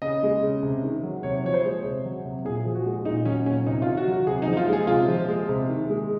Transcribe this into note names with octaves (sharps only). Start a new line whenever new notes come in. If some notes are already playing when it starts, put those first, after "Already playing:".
C#3 D#5
G#3
C#3
C3
D#3
F#3
C3 C#5
F3 C#5
C5
G#3
C3
F#3
C3
A#2 G#4
F3
F#4
G#3
A#2 D#4
F#3 C#4
A#2 C#4
C3 D#4
F4
D#3
F#4
F#3
F#4
C3 G#4
D#4
F3
D#4
F4
G#3 G#4
C3 F4
F3
G#3
C3
D#3
G#3